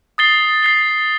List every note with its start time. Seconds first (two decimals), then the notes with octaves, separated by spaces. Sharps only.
0.18 D#6 A6 C7 G7
0.63 A6 C7 G7